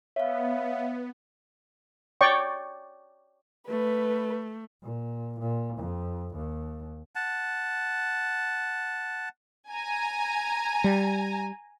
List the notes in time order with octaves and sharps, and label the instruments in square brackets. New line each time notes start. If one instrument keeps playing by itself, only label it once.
[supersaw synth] B3 [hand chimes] C#5 F5 [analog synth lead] E5
[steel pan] C#5 D5 G5 C#6
[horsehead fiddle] A3 [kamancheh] B4
[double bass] A#2
A#2
F2
D#2
[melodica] F#5 A5
[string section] G#5 A#5
[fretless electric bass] G3